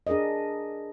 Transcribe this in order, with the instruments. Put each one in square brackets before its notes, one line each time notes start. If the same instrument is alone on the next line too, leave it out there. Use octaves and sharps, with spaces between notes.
[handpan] D4 G#4 A#4 D5 D#5